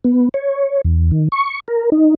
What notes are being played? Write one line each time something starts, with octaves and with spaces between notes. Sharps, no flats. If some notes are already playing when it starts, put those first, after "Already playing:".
B3
C#5
E2
D#3
C#6
A#4
D#4